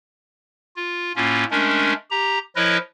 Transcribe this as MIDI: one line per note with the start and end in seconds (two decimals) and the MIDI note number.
0.76 1.12 65
1.16 1.45 45
1.16 1.45 58
1.16 1.45 61
1.16 1.45 65
1.51 1.93 56
1.51 1.93 57
1.51 1.93 61
1.51 1.93 62
1.51 1.93 70
2.11 2.39 67
2.11 2.39 82
2.56 2.78 53
2.56 2.78 64
2.56 2.78 70
2.56 2.78 71
2.56 2.78 73
2.56 2.78 75